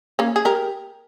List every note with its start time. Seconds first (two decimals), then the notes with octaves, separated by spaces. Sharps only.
0.19 A#3 C#4
0.36 G#4
0.45 G4 A#4